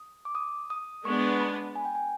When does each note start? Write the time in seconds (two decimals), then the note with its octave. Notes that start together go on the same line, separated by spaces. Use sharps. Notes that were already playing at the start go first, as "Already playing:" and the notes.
Already playing: D#6
0.25 D6
0.35 D#6
0.70 D#6
1.05 G#3 B3 D4 C#6
1.41 B5
1.76 G#5
1.85 G5
1.95 G#5